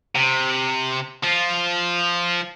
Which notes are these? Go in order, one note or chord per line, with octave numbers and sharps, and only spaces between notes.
C3
F3 F4